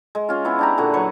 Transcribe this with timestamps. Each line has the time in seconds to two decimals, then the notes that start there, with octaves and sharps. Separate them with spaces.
0.15 G#3
0.29 C#4 F4
0.45 B3 C#4 E4 G#4
0.59 D4 G4 A#5
0.77 A#2 D3 F#4 G#4
0.93 F#3 B4 C#6